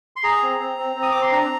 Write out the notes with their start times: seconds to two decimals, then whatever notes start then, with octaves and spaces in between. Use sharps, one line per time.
0.16 C6
0.24 G#4 A#5
0.42 C4
0.60 C4
0.78 C4
0.96 C4
1.02 D#6
1.12 C4 D6
1.22 C6
1.32 D4 A#5